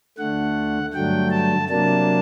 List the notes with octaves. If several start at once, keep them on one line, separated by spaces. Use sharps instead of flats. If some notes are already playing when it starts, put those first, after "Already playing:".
D2 D3 A3 F#5
G2 D3 F#3 A3 G5
A5
C3 F#3 A#3 D4 A5